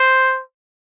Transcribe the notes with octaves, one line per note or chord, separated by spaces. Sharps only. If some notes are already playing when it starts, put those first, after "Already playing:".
Already playing: C5